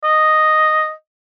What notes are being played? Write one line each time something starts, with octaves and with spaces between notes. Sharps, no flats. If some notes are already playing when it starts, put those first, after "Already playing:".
D#5